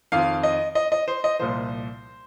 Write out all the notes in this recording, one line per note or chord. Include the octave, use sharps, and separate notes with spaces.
F2 D#3 C4 F5
D#5
D#5
D#5
C5
D#5
C2 A#2 F3 C5